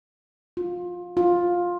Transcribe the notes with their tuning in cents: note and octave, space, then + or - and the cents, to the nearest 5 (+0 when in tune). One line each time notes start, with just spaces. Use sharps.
F4 +20
F4 +10